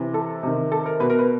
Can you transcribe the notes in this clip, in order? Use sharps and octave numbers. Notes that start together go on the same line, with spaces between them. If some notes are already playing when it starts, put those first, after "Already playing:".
Already playing: C3 E3
A4
C3 D#3
A4
A#4
B2 B4
A#4
B4